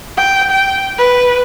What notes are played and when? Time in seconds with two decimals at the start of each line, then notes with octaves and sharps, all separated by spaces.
0.17 G5
0.51 G5
0.98 B4